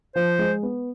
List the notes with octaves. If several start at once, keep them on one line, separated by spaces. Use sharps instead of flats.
F3 C5
G#3
B3